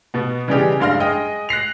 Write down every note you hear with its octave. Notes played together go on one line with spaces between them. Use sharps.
B2 B3
C#3 E3 G3 G#3 D4 G4
F#1 G2 F5 C6 F6 A#6
G#3 D#5 G5
F#6 A#6 C7 F7